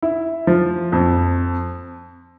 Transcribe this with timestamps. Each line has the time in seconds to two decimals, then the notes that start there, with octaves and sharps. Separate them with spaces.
0.02 E4
0.47 F3
0.92 F2